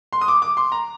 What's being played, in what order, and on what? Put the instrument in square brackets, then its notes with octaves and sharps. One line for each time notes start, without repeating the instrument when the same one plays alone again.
[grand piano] C6
D#6
D6
D6
C6
A#5